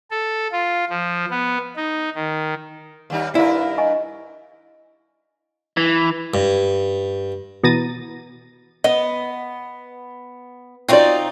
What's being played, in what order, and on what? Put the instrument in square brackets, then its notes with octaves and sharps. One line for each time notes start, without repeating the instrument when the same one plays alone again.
[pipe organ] A4
F4
F3
B3
D#4
D#3
[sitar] D#2 G3 D#4
[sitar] G2 D#4 A#4 [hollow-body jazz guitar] E4 [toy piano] D5
[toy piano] D#5 G#5 C#6
[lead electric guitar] E3
[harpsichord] G2
[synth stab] B2 E3 A#5 A6 A#6 D#7
[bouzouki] B3 [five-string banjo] D#5
[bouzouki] C4 D#4 F4 [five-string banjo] F#4 D5